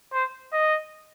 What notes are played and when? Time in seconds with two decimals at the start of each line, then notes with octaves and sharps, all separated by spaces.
0.13 C5
0.52 D#5